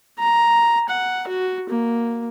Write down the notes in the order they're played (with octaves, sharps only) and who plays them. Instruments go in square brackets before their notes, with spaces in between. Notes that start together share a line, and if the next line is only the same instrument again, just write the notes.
[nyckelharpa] A#5
F#5
F#4
A#3